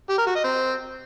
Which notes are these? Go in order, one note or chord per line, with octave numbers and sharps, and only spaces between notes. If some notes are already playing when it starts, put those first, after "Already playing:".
G4
A#4
F#4
D#5
C4